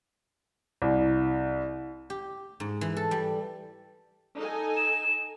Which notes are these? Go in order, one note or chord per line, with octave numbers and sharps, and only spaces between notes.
C2
G4
G#2
E3
A4
G3
D#4 A4 G#5
E7